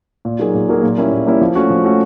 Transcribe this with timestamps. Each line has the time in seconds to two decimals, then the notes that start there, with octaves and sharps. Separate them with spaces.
0.25 A#2
0.39 F#3 A#3 D#4 G#4
0.54 A#2
0.69 F#3 A#3 D#4 G#4
0.83 A#2
0.98 G3 A#3 C#4 E4
1.12 A#2
1.27 G3 A#3 C#4 E4
1.41 F3
1.55 A3 C#4 F#4
1.70 F3
1.84 A3 C#4 F#4